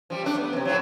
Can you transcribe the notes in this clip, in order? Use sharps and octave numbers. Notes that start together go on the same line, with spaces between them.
F3 G3
A3 D4
B3
F2 C3
A2 F3 F#3